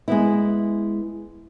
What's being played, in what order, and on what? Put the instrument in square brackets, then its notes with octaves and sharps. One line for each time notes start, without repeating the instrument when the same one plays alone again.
[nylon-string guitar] G#3 B3 E4